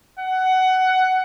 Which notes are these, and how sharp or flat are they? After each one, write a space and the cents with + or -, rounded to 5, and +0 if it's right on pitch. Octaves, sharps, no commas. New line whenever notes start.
F#5 +15